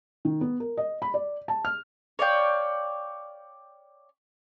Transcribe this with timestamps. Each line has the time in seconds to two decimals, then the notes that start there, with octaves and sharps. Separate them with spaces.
0.25 D#3
0.41 B3
0.60 A#4
0.77 D#5
1.02 B5
1.14 D5
1.48 A5
1.65 F6
2.19 C#5 D5 F5 G5